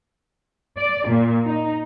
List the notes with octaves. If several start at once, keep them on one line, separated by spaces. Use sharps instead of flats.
D5
A#2
D#4